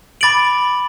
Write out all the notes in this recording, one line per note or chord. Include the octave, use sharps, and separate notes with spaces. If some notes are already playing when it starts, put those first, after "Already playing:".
B5 D6 A6 D7 F#7